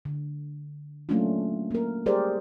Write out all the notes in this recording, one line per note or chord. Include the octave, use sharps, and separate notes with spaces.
D3
F#3 A3 A#3 C#4 D4 F4
A#3 A#4
G3 G4 G#4 A#4 C5 D5